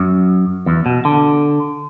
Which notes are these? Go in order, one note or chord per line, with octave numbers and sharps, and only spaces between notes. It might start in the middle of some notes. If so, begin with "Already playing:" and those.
Already playing: F#2
E2
B2
D3